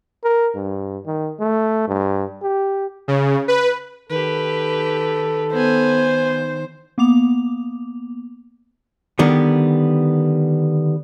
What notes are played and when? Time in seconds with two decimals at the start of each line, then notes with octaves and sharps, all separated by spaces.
0.24 A#4
0.55 G2
1.07 D#3
1.39 A3
1.88 G2
2.42 G4
3.08 C#3
3.48 B4
4.10 D#3 G4 A4 B4
5.53 B3 C5 G#5
6.98 A#3 B3 D6 F7
9.19 D3 D#3 G3 B3